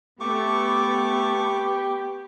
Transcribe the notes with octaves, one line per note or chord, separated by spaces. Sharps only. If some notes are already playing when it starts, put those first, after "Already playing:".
A3 B3 G4 C#6 D6